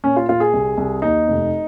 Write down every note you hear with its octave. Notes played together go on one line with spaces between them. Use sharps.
A#2 C#4
F4
A#2 F4
G#4
C2
C2
D#2 D#4
F1